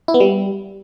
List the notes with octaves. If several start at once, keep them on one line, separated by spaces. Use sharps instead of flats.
E4
B3
G3